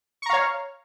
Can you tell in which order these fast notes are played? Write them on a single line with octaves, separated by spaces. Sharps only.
C#6 A#5 F5 C#5